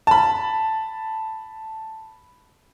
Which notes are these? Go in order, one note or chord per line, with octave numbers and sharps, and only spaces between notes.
A5 B5